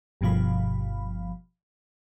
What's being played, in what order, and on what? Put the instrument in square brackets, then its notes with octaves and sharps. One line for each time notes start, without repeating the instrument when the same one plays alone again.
[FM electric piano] G1 G2 B2 F3 F5 B5